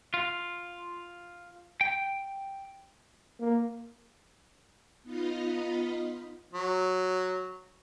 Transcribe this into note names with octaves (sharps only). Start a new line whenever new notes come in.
F4
G5
A#3
B3 D#4 F4 D#5 F5 B5
F#3